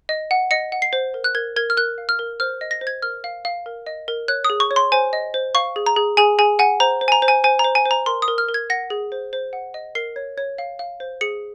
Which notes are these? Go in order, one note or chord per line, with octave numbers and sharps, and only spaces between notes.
D#5
F#5
D#5 C#7
F#5
C7
C5
A#4
F#6
A#4 G#6
A#4 G#6
F6
A#4 F#6
F5
F6
A#4
C5 F6
D#5
A#6
C5
G#6
A#4 F6
F5
F5
A#4
D#5
A#4
C#5 F#6
D#6
G#4
C#6
C#5
C6
C5 G#5
D#5
C5
F5 C#6
G#4
A#5
G#4
G#4 G#5
G#4 G#5
F#5 G#5
C5 A#5
C5
G#5
A#5
C5
G#5
C5 G#5
A#5
C5
G#5
C5
A#5
A#4 C6
D#6
A#4
F6
A#4
G#6
F#5 A#6
G#4
C5
C5
F#5
D#5
A#4 C7
C#5
C#5
F5
F5
C5
G#4 C#7